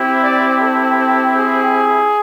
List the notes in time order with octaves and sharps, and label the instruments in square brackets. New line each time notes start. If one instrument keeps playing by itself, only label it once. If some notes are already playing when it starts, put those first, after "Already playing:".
Already playing: [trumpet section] C4 E4 G4
D5
A4
G#4